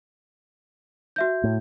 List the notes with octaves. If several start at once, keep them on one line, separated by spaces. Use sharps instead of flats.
F#4 E5 G6
A2